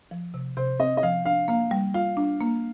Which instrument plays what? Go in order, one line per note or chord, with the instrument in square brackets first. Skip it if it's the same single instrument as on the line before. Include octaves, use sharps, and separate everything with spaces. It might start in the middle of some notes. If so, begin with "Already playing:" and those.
[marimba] F3
C3
[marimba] C3 [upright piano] C5
[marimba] C4 [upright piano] D#5
[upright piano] D#5
[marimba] F3 [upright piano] F5
[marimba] D4 [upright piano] F5
[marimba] A#3 [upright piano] F5
[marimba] G3
[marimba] F4 [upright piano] F5
[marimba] D4
A#3